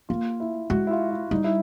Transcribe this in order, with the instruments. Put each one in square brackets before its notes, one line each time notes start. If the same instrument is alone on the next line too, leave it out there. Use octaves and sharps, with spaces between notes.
[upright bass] A#3 [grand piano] F4
[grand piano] E4
[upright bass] G#3 [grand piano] F#4
[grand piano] E4
F4
E4
[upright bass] G3 [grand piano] D#4
[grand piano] E4